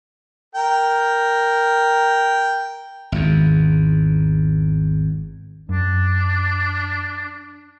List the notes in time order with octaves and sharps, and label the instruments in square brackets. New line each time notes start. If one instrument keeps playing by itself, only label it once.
[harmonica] A#4 G5
[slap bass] G#1 E2
[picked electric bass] F#2 [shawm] D4